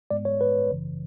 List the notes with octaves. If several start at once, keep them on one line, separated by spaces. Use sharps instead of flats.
G#2 G#3 B3 D5
C#5
B4
G#1 F#2 C#3 E3